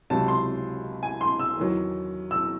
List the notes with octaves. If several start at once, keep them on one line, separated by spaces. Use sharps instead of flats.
C#2 C3 F#3 A5
C6
G#5
C6
E6
E2 D#3 F#3
E6